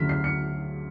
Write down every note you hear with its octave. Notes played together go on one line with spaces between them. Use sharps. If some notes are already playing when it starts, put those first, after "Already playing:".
Already playing: D2 C#3 F#3 F6 B6
C7
C#7